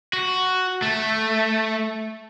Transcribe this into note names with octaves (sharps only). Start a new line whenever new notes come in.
F#4
A3